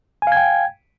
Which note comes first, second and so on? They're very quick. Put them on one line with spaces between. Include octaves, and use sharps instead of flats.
G#5 F5 G#6 G5